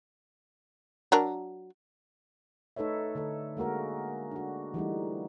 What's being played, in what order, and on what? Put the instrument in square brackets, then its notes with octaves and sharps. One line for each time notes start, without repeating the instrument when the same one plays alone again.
[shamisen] F#3 D4 A#4
[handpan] A3 D#4 A4 B4 C#5 E5
D3 A3 D4 A4
G#3 A#3 F#4 A#4
D4 F#4
E3 G3 A3 D#4